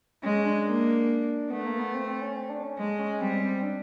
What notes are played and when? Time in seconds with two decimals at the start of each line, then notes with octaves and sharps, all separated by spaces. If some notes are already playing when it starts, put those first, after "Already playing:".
0.23 G#3 C#4
0.45 D4
0.66 A#3
1.50 A3 B3
1.66 A#3
1.79 B3
1.94 C4
2.07 C4
2.22 C#4
2.36 C4
2.50 D4
2.63 C#4
2.79 G#3
2.99 C#4
3.21 G3 C4
3.41 C4
3.63 D4